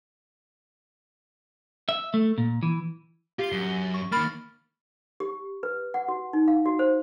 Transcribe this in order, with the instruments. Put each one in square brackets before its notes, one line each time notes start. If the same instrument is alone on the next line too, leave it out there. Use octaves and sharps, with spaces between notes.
[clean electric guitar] E5
A3
A#2
E3
[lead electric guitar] F4 [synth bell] G4 G7
[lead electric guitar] F#2
[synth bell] C#6
[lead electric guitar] D#3 A#3 [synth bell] B5 F6 A6
[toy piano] G4
B4
F#5
F#4
D#4
F5
F#4
C5